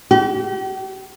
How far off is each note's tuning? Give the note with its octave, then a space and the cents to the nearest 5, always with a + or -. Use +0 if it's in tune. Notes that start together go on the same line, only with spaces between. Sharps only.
G4 -40